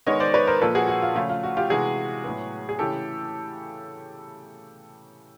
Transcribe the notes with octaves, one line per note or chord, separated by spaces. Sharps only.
D#3 G#3 B3 C#5 D#5
C5 D5
B4 C#5
A#4 C5
A#2 F3 A#3 A4 B4
F#4 G#4
F#4
F4
C#3 F3 A3 F4
F4
F#4
F4 G4
C3 E3 G#3 B3 F#4 G#4
A2 F#3 B3
G#4
C#3 E3 A3 G4 A4